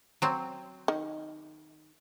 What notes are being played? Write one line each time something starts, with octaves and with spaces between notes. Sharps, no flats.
F#3 C4
D#3